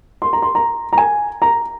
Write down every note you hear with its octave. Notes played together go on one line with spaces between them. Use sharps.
C6
A#5
C6
A#5
A#5
G#5
A#5